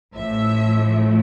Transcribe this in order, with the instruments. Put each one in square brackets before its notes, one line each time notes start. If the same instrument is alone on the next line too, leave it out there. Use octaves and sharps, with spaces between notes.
[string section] A1 A2 F3 A3 E5